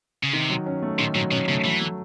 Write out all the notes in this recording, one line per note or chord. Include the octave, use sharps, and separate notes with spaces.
C#3
C3 D#3
F#3
C#4
A3
A#2 D#3
A#2 F#3
B2 C#4
C#3 A3
E3 F#3
A3